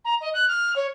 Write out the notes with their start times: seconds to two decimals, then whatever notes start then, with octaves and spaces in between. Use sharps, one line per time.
0.05 A#5
0.21 D#5
0.34 F#6
0.48 F6
0.76 C#5